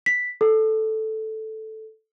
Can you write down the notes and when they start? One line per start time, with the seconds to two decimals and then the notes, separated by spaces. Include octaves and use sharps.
0.06 B6
0.41 A4